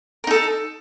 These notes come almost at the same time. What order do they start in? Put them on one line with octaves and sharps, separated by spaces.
A#4 D#4 A4